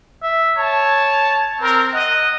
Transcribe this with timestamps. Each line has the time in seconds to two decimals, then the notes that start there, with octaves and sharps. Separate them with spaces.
0.23 E5
0.57 C#5 A5
1.61 C4 A#4
1.94 D#5 F#5